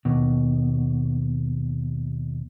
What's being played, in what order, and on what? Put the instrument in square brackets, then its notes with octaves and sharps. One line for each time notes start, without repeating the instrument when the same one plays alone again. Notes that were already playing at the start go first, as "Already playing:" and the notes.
[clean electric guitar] D#2 B2